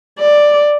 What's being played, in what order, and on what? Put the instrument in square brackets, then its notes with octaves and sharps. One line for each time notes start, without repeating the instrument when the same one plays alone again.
[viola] D5